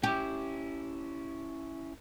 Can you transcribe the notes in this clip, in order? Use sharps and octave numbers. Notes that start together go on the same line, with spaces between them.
C#4 E4 G4